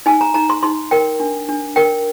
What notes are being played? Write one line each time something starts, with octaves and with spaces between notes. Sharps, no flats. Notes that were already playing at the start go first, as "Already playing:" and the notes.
D#4 G#5
A#5
D#4 A#5
C6
D#4 C6
A#4 G5
D4
D4
A#4 G5